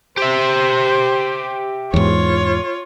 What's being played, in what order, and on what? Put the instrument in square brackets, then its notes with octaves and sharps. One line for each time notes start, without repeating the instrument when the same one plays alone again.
[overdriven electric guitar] G4 E5 [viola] C5
[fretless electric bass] E2 G#2 [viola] F4 C#5